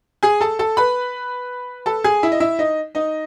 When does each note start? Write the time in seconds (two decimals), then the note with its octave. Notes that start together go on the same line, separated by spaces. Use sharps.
0.23 G#4 G#5
0.41 A4 A5
0.59 A4 A5
0.77 B4 B5
1.86 A4 A5
2.04 G#4 G#5
2.23 E4 E5
2.32 D#5
2.40 E4 E5
2.59 D#4 D#5
2.95 D#4 D#5